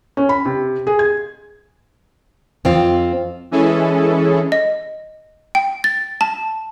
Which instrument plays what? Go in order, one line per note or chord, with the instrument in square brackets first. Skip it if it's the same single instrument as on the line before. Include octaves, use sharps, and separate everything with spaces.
[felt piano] C#4
B5
C3
G#4
G#6
[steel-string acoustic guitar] F2 C4 F4
[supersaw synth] E3 G#3 C#4 E4 G#4 A4
[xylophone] D#5
G5
A6
A5